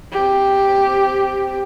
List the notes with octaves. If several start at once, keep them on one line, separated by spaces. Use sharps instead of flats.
C4 G4